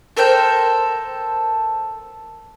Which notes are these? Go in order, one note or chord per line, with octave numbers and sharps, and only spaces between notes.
A4 A#4 C5 G5